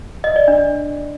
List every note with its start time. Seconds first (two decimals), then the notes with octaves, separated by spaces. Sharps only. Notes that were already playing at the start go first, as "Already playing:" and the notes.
0.24 D#5
0.36 D5
0.48 D4